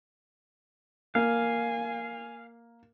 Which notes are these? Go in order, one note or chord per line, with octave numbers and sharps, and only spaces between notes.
A#3 F5 G#5